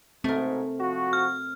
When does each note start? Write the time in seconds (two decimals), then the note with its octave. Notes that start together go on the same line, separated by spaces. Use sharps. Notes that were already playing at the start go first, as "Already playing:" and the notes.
0.24 G#2 B2 A3 C4 A#4
0.80 F3 F#4
1.13 F6